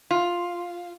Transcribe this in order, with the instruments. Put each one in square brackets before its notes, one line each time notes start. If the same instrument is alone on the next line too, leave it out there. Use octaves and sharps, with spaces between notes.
[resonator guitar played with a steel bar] F4